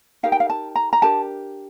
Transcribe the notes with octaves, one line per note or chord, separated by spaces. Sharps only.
D#4 G4 A#4 F5
G5
F5
A5
A#5
A#5
D4 G4 A#4 A5